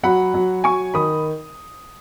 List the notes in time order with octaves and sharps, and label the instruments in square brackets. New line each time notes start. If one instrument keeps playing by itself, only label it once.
[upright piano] F#3 [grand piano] F#5 B5
[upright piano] F#3
[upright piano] F#3 [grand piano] G#5 C#6
[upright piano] D#3 [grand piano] B5 D#6